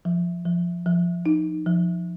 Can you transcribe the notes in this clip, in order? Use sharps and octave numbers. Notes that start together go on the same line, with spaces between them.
F3
F3
F3
D#4
F3